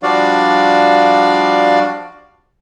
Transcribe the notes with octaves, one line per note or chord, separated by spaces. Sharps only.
F3 G3 D4 F#4 D5 F5